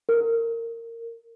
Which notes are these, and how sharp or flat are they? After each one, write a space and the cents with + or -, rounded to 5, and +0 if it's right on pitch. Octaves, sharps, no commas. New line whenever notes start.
A#4 -20